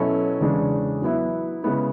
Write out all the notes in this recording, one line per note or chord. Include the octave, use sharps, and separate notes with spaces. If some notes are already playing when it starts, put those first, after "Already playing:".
Already playing: B2 F#3 C#4 E4 A4
E2 C#3 G#3 D4
F#3 B3 E4
C#3 G#3 B3 E4